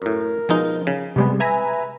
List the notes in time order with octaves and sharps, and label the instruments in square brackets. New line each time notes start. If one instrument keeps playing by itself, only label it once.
[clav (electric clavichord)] F#2 A2 [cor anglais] A#4
[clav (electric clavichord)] B2 G#3 D#4 [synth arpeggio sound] F3
[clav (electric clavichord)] C#3
[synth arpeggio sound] C3 G3 G#3 [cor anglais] B3
[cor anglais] B4 [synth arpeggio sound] E5 G#5 A#5